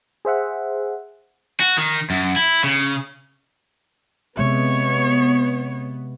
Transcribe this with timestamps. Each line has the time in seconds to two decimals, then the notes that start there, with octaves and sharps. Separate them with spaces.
0.25 G#4 C5 E5 F#5
1.60 F#4
1.78 D#3
2.10 F#2
2.36 E4
2.64 C#3
4.37 C3 G#3 B3 C#5 E5